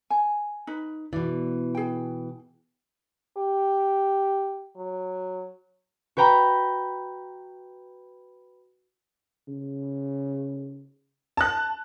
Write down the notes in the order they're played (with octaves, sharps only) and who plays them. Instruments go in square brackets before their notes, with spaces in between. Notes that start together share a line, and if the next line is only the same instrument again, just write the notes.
[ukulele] G#5
D#4 B4
[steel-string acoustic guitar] B2 E3 [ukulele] D5
[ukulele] G#4 G5
[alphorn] G4
F#3
[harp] F#4 B4 G5 A#5 B5
[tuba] C#3
[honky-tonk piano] A5 F#6